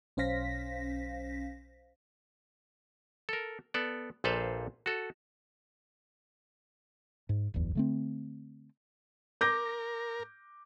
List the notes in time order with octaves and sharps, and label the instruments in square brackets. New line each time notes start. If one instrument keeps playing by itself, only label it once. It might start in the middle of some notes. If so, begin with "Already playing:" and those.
[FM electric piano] B1 C#4 C5 F5 A#6 B6
[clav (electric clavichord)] A4 A#4
B3 A4 D5
A#1 A#2 A4 B4 C5 F5
F#4 A4
[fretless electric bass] G#2
D1 G1 E2
D3 A3 C4
[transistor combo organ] A#4 [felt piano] D6 G6 A#6